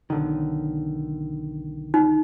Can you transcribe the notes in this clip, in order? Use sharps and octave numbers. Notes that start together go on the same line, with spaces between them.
B1 D3 D#3
D#4